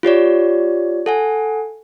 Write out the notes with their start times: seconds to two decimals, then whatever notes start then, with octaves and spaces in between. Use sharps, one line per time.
0.03 F4 G4 C#5 D5
1.06 A4 F#5 G#5